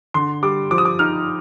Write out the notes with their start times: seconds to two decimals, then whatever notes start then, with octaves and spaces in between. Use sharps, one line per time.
0.14 D3 C6
0.42 G3 D6
0.71 F3 D6
0.78 D#6
0.85 D6
0.99 D#4 F6